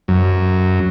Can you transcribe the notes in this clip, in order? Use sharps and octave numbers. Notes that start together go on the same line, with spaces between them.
F#2